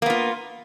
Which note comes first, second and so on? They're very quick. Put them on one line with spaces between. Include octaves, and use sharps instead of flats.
A#3 B3 F4